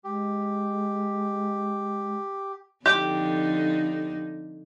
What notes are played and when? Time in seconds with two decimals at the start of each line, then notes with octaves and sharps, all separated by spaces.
0.04 G#3 G4
2.86 F2 D3 D#4 G4